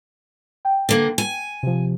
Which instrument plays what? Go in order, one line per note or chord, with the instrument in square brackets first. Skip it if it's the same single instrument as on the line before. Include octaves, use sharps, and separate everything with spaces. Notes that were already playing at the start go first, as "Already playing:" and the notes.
[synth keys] G5
[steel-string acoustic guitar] D3 A#3
G#5
[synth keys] C3 F3